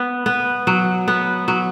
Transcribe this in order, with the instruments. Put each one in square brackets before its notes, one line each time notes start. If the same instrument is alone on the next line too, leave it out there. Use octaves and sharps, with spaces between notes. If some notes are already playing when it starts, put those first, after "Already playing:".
Already playing: [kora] B3
B3
F#3
B3
F#3